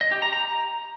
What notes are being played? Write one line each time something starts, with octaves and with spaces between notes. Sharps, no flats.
D#5
G4
A#5
A#5